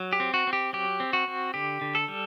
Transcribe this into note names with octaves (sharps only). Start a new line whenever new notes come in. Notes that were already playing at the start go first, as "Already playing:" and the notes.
Already playing: F#3
G4
C4
F#4
C4
G4
F#3 G4
C4
F#4
C4
D3 G4
D3
A4
G3